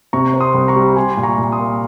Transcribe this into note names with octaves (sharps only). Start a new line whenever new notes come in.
C3 A#5 C#6
C4
C6 D#6
C2
A#5 C#6
G3
G3 G#5 C6
A#2
A#5 C#6
A#2
C6 D#6
A#3